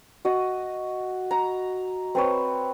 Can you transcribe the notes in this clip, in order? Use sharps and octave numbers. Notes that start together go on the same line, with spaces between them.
F#4 D#5
A#5
C4 B4 C#5